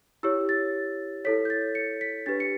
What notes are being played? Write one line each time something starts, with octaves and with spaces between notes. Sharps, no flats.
E4 G4 C#5 E6
A6
E4 A4 C#5 B6
G6
A6
C#7
B6
D4 G4 B4 A6
C#7